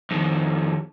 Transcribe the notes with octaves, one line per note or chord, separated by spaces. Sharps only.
F2 D#3